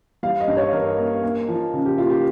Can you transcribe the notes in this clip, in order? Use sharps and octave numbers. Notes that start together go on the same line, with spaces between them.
G3 F5
D#5
G2
C#5
G2 A#4
A#3
A#3
F3
C#3
G4
A#3 F4
G4